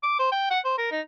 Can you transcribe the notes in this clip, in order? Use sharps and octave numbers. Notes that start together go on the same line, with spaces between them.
D6
C5
G5
F#5
C5
A#4
D#4